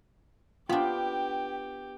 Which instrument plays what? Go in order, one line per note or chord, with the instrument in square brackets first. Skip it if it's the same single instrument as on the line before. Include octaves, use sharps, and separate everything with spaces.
[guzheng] B3 D4 [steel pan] F4 [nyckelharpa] G4 [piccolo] G5